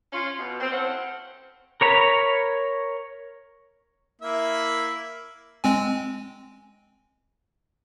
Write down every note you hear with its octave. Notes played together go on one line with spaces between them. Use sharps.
C#4 F4
B2
C4
A2 C#4 C5 F5 F#5
A#4 C#5 A#5 B5
A#3 E4 E5
G#3 C4 G#5